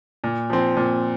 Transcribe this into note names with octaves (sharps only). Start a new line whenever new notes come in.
A#2
F3 C4
A#2